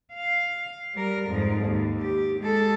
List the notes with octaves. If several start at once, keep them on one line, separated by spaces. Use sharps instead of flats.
F5
G3 A#4
F2 G#2
D#2
G4
G#3 A4